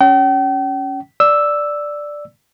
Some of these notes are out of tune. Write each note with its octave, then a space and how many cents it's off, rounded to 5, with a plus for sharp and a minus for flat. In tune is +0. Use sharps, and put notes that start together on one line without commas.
C#4 +10 G5 -40
D5 +0 E6 +0